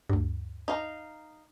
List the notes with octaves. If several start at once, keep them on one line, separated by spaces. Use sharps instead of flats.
D2 G2
D#4 F5